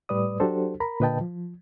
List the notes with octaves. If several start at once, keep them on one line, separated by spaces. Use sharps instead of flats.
A2 G3 B4 D5 D#6
F#3 D4 F#4 G4 A4 C5
A#4 A#5 B5
A#2 D3 B4 D#5 G5 A5
F3